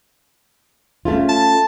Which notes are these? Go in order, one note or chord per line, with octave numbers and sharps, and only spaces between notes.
A3 C#4 F4
A5